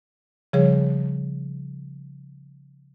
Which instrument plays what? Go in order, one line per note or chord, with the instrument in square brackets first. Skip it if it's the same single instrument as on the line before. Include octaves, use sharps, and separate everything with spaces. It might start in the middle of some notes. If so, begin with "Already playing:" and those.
[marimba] C#3 F3 G3 G#4 C#5